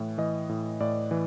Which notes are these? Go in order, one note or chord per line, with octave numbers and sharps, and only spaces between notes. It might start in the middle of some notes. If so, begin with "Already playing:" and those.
Already playing: A2 E3
E3 D#5
A2
A2 D5
E3